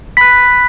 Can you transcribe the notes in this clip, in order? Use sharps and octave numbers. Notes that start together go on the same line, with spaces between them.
B5 F#6 B6